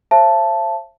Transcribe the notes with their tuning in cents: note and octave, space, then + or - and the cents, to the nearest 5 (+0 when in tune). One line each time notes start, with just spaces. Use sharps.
C5 +40 E5 +45 A5 +0